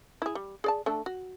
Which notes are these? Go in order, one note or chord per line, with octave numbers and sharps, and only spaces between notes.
E4 G#4
G3
G#4 D5 A5
A3 D4 A4
F#4